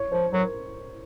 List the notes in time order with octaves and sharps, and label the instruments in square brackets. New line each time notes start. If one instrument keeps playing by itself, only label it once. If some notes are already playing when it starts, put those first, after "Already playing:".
Already playing: [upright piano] C#5
[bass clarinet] F3 [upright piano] C5
[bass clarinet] F#3 [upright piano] A#4